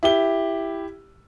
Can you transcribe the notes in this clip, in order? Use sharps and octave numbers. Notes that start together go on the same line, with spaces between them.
E4 G4 G7